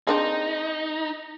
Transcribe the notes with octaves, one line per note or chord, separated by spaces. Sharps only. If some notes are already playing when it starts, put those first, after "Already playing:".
C4 D4 D#4 G#4